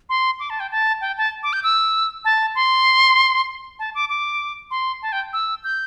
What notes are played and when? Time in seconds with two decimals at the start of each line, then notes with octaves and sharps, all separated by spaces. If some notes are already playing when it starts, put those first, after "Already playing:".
0.09 C6
0.40 D6
0.50 A5
0.60 G5
0.71 A5
1.01 G5
1.17 A5
1.43 D6
1.53 G6
1.63 E6
2.25 A5
2.55 C6
3.79 A5
3.95 D6
4.09 D6
4.71 C6
5.02 A5
5.12 G5
5.33 E6
5.64 G6